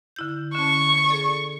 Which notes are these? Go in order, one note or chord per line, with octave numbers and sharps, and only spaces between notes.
D3 E4 G6
D3 C#4 A5 C#6
G#4 A4 D5